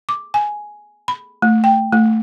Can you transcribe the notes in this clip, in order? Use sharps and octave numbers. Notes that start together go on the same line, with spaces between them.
D6
G#5
B5
A3
G5
A3